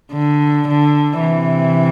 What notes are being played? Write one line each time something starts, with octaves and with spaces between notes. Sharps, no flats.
D3
D3
C3 E3